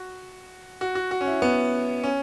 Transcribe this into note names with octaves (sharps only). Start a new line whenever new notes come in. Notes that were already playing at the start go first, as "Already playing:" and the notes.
Already playing: F#4
F#4
F#4
F#4
C#4
E4
B3
C#4